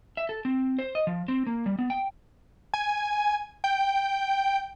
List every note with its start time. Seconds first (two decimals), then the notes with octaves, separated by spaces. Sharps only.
0.17 E5
0.29 A4
0.45 C4
0.79 C5
0.95 D#5
1.07 F3
1.28 C4
1.47 A#3
1.66 G3
1.79 B3
1.90 G5
2.74 G#5
3.64 G5